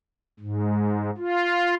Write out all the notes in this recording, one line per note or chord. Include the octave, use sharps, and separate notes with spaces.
G#2
F4